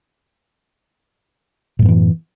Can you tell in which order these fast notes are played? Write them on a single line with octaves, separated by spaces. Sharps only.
A2 F#2 B3 E3